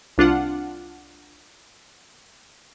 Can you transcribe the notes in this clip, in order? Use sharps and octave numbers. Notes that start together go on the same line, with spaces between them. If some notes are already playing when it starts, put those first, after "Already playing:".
C2 D4 F4 F#5